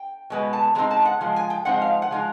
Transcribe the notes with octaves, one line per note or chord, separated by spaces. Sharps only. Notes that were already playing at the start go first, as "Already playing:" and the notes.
Already playing: G5
B2 G#3 B3
A5
F3 G#3 C4 D#4 A#5
A5
F#5
F3 G#3
G#5
G5
F3 G#3 C4 D#4 F#5
F5
F#5
F3 G#3 D#4